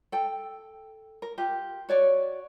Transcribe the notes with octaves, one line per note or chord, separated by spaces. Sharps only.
A4 G5
A#4
F4 G4
F#4 C#5 D5